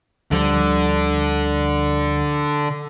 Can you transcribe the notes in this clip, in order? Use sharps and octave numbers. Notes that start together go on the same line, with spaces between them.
D2 D3 F3 G3